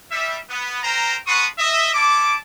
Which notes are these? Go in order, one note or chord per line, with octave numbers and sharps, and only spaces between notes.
G3 E5
B3
A#4 C5 G5 A#5
F#4 B4 A5 C6 C#6 D#6
D#5 E5
C#4 E4 A5 D6